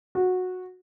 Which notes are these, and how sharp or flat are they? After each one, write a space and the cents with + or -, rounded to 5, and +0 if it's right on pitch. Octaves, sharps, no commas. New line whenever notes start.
F#4 -15